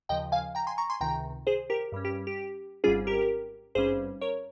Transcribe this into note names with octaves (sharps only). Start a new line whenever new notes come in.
D#2 C#3 F3 D#5 G5
F5 G#5
G5 A#5
G#5 C6
A#5 C#6
G#5 C6
C#2 C3 D#3 G5 A#5
G#4 C5
G4 A#4
G2 G3 C#4
G4
G4
G#1 G#2 G3 C#4 F4 G#4
G4 A#4
G#1 G2 G3 C#4 G#4 C5
A#4 C#5